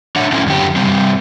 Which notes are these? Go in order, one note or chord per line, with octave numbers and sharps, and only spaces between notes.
D4 C#5 E5 F#5
F#3 A3 C4 C#4 E4
F#2 D3 G4
G2 B2 G3 C4